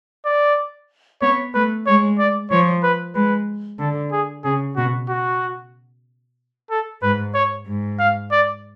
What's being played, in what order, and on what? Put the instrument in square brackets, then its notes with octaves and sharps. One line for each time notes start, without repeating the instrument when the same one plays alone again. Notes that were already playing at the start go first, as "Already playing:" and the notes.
[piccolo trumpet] D5
[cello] B3 [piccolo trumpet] C#5
[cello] A3 [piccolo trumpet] B4
[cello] G#3 [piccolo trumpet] C#5
[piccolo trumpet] D5
[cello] F3 [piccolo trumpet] C#5
[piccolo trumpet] B4
[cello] G#3 [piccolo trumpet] B4
[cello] D3 [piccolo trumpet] A4
[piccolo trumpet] G#4
[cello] C#3 [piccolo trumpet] G#4
[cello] B2 [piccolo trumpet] F#4
[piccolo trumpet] F#4
A4
[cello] G#2 [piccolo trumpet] B4
[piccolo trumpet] C#5
[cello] G#2
[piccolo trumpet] F5
D5